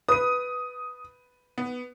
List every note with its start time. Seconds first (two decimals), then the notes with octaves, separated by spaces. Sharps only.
0.08 B4 D#6 D#7
1.58 B3